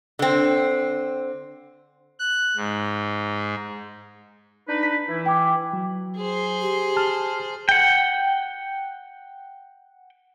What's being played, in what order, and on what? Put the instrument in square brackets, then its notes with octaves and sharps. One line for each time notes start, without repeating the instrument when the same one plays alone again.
[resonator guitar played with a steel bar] D3 C4
[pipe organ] F#6
G#2
[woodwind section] D4 D#4 B4
[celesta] B6
[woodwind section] E3 E4
[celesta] G5 D6
[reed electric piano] F#3
[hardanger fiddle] G#4 C5
[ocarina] G4
[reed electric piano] A5 F6
[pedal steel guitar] F#5 G5